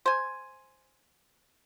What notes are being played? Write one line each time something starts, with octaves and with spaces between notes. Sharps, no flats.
C5 G#5